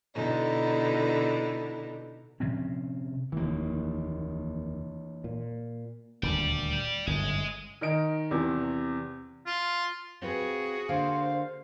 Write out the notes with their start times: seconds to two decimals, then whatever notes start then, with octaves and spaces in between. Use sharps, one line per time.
0.15 B2 D3 D#4 E4
2.40 C3 F3 C4 C#4
3.32 F1 D#2 E3 A#3
5.24 A#2
6.23 D#1 D2 D5 G5
7.07 G1 F#2 A2 D#5 G#5
7.81 D#3 D#5 D7
8.31 E2 C3
9.46 F4
10.22 C4 F4 F#4 G#4 B4
10.89 D3 A3 A#3 C5 F5